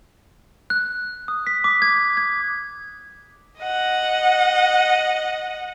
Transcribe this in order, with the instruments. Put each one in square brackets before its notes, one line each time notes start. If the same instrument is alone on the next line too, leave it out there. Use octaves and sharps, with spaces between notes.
[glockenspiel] F#6
D#6
B6
D6
G#6
G#6
[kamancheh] D#5 F#5